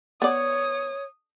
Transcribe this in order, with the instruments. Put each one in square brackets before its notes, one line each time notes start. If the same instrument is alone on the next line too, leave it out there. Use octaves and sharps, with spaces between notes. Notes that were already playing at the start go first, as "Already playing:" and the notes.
[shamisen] B3 D5 [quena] C#5 [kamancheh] D#6